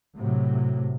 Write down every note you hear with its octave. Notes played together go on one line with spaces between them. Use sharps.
A2 C3 F#3